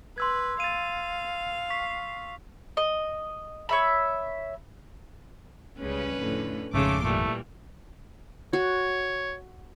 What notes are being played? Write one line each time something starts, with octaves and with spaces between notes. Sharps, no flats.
B4 C6 E6 G#6
F5 A6 D#7
C#6 B6 C7
D#5
C#5 E5 B5
C#2 C#3 G3 C#4 B4
F2 A2 D3
G#1 F2 G#2 C#3 A3 A4 C6 D6
A#2 E3 G3 A3
F#4 C#5